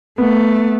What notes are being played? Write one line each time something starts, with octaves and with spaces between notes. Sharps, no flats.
A3 B3